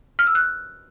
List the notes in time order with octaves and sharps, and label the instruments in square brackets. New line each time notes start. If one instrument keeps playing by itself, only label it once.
[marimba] F6
E6
F#6